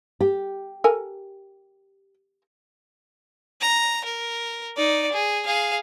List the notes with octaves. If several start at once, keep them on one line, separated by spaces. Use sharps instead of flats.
G4
A4 A#4 G#5
A#5
A#4
D#4 D5
G#4
G#4 F5